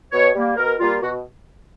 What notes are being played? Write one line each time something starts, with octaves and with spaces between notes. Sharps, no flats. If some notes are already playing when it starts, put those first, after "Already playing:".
B2 C#5
G3 A#3
B2 A#4
G3 A#3 F4
B2 F#4